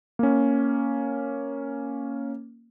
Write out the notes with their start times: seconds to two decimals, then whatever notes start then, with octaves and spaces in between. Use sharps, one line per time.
0.19 A#3 C#4